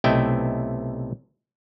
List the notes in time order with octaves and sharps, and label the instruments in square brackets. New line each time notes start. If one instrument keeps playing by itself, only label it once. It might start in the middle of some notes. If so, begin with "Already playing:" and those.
[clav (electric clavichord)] B1 C3 A3 E4 D#5 G5